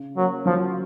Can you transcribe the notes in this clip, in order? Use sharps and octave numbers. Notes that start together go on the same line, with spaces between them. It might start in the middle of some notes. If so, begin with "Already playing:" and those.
Already playing: C#3
F#3 A#3
F3 F#3